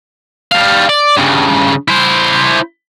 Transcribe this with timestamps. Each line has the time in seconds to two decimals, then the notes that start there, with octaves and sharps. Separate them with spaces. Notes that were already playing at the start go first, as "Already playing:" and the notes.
0.52 G3 F5
0.89 D5
1.17 G2 C#3
1.88 E4 C5